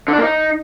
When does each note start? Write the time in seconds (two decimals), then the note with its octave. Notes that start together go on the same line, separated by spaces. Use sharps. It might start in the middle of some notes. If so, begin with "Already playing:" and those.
0.08 D3
0.13 D4
0.18 A#3
0.23 D#4